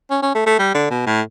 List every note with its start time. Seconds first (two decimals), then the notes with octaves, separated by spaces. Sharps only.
0.10 C#4
0.22 C#4
0.35 A3
0.46 A3
0.59 G3
0.74 D3
0.90 B2
1.06 A2